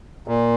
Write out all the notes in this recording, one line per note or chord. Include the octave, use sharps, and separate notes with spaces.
A#2